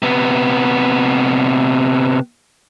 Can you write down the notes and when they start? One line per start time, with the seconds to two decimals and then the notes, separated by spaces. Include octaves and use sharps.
0.02 C3 B3